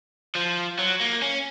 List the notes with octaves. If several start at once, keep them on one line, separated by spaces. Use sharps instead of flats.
F3
F#3
A#3
C#4